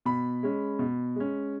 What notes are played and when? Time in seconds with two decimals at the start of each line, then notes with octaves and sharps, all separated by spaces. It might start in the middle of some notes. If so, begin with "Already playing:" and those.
0.05 B2 B5
0.43 G#3 C#4
0.79 B2
1.16 G#3 C#4